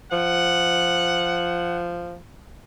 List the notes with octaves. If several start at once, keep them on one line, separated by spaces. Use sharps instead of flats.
F3 F#5